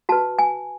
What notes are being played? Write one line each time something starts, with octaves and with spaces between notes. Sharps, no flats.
F#4 B4 A5
G#5